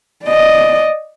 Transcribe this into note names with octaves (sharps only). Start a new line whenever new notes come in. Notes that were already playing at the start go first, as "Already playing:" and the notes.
D5 D#5